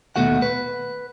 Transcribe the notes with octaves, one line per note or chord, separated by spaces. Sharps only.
D#2 B2 A3 F#4 F#5
B4